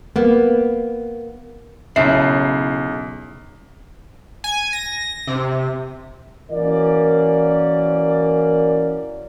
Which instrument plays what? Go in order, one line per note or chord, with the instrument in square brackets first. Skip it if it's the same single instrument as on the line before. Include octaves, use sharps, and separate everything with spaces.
[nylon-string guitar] A#3 B3
[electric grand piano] B1 C7 [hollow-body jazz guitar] C#3 E4 [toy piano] E5 A5
[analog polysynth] G#5
A#6
C3
[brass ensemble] E3 A#3 C#4 F#4 A#4 D5